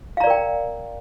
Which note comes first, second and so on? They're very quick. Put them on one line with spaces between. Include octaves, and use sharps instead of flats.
F5 A#5 D5 A#4 G5